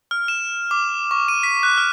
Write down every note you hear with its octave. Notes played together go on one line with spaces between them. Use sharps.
F6
E7
D6
C#6
D#7
B6
F#6
F6